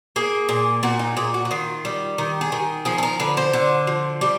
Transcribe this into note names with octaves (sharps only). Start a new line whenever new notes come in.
A#3 G#4
A#2
A#2 F#4
D#4
A#2 G#4
F#4
F#4
D#3 F4
G3
D#3
G#4
D#3
F3 G#4
A4
A#4
D3 B4
C5
D3
F3
G3 G4